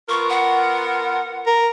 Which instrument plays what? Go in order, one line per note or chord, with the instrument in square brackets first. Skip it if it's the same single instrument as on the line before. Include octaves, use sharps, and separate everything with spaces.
[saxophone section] B3 F4 A#4 [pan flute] C#6
[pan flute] F#5
[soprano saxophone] A#4